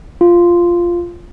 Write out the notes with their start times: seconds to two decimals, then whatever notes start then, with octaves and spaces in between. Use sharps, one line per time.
0.21 F4